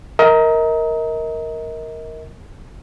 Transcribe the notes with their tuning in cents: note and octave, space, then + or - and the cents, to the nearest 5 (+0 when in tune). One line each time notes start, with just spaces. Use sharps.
A#4 +0 D#5 +35